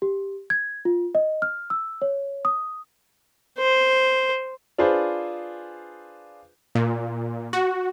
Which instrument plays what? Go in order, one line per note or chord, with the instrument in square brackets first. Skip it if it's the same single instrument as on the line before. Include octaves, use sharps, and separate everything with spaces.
[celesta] G4
G#6
F4
D#5
F6
E6
C#5
D#6
[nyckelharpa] C5
[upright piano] D4 F4 G#4 B4 C5
[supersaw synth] A#2
F#4